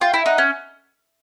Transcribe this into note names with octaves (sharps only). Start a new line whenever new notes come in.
F4 G5
E4
D#4 F#5
C#4